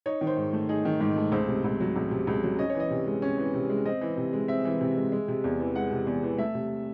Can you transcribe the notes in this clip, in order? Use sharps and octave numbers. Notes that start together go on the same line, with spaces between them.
D#4 C#5
D#3
C5
G#2
A3
D#4 G#4
D#3
G#2
A3
C#2 C5
C3
C#2
F#3
C#2
C3
C#2
F#3
C#4 D#5
C#5
E3
D#5
C3
G#3
C#4
E3
C3
G#3
C4 D#5
E3
C3
G#3
C4 E5
E3
C3
G#3
G#3
C3
E2
E3
G#3 F#5
C3
E2
E3
A3 E5
C3